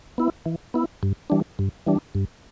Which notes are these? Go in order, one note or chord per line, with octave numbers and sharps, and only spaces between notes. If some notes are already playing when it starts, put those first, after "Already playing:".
B3 E4
E3
B3 E4
G2
E3 G3 D4
G2
E3 G3 D4
G2